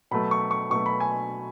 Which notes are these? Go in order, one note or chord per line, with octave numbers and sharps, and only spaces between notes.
B2 F#3 A3 B5
C#6
C#6
B2 F#3 A3 C#6
B5
G#5